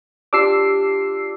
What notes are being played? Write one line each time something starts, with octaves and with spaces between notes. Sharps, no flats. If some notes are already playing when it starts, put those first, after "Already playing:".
D4 F4 G4 D6 E6 C7